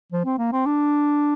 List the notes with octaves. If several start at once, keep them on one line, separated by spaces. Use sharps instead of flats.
F3
C4
A#3
C4
D4